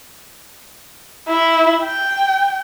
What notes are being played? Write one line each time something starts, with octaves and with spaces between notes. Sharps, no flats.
E4
G5